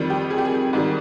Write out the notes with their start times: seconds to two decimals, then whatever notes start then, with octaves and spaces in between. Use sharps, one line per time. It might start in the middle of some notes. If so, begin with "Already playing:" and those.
Already playing: F2 D#3 G3
0.10 G4
0.30 G#4
0.38 G4
0.45 G#4
0.73 G#2 D#3 G3